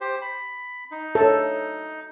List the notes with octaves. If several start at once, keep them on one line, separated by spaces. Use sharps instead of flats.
G4 C5
B5
D#4
F#3 A4 C#5